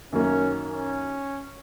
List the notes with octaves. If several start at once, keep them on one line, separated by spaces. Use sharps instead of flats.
F#2 D#3 F#3 A#3 C#4
C#4